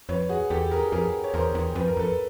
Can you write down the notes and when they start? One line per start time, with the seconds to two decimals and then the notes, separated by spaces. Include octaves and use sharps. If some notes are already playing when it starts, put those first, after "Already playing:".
0.09 F2 B4 C#5
0.29 F#4 G#4
0.50 E2 G4 A4
0.71 G#4 A#4
0.92 F2 G#4 A#4
1.24 C#5
1.34 E2 A#4 C5
1.55 E2
1.75 F2 B4
1.88 A#4
1.97 F2 A4 B4